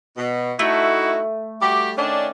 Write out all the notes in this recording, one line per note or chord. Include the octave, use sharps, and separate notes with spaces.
B2
A3 D#4 E4 F#4
G3 F#4 G4
D#3 C#4 D4